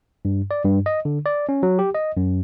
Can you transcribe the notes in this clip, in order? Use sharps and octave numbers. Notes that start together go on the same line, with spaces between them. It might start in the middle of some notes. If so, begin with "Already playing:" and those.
G2
D5
G2
D#5
D3
D5
C#4
F#3
G4
D#5
F#2